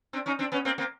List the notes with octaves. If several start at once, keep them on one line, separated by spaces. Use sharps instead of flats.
C4 D4
C#4 D#4
C4 D4
B3 C#4
A#3 C4
A#3 C4